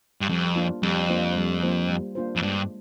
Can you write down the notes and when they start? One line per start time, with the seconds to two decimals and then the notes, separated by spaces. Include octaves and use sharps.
0.21 G2
0.29 F2 G3
0.56 A#3 D4 F4 C5
0.83 F2 G3
1.09 A#3 D4 F4 C5
1.36 G3
1.63 A#3 D4 F4 C5
1.89 G3
2.15 A#3 D4 F4 C5
2.36 F2
2.42 G2 G#3